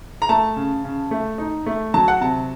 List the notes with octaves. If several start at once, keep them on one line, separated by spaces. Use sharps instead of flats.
A#5
A3 A5
C#3
C#3
A3
D#4
A3
F#3 A5
F#5
C3 A5